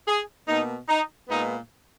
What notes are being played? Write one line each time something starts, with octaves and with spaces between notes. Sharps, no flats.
G#4
B2 A#3 D#4
D#4
A#2 G#3 B3 D#4